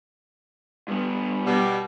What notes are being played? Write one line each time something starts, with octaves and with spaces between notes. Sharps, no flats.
G2 B3
B2 G3